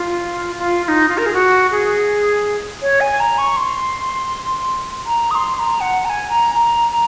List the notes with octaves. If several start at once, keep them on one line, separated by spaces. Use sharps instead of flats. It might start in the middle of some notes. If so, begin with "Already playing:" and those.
Already playing: F4
F4
F4
D#4
F4
A#4
G#4
F#4
G#4
C#5
G#5
A#5
C#6
C6
A#5
D#6
C6
C6
A#5
F#5
A#5
G#5
A#5
A#5
A#5